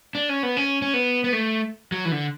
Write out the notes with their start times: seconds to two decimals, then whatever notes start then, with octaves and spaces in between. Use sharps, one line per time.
0.15 D4
0.29 C#4
0.43 B3
0.57 C#4
0.82 C#4
0.94 B3
1.24 B3
1.33 A3
1.92 F#3
2.05 E3
2.12 D3